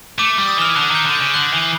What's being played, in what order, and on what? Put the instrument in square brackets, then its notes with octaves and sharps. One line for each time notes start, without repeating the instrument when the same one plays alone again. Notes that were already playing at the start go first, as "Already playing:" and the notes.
[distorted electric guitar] A3 [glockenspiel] D6
[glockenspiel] D6
[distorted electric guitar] G3
[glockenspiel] D#6
[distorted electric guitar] E3 [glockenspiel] F6
[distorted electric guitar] D3 [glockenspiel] F#6
[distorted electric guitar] D#3 [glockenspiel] G6
[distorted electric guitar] D3
[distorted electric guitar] C#3 [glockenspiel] G6
[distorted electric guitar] D3 [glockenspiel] F#6
[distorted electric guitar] E3 [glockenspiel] C7